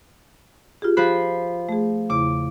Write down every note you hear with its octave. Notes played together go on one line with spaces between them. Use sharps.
F4 G4 G#4
F3 C5 B5 F#6
A3 G#4
E2 C#3 E4 D6